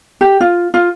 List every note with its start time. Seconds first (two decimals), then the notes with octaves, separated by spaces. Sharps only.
0.21 G4
0.41 F4
0.74 F4